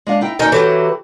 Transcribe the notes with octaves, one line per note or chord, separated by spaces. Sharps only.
G#3 D4 F5
D#4 E4 G5
D#2 D#4 F#4 A#4 G5 G#5
E3 F#3 F#4 G4 A4